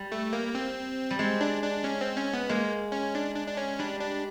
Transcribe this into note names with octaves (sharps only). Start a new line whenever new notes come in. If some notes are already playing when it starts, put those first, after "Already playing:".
Already playing: G3
A3
A#3
C4
G3
G#3 C4
D4
D4
C#4
C4
C#4
B3
G#3 A#3
C#4
D4
D4
D4
C#4
G3 D4
D4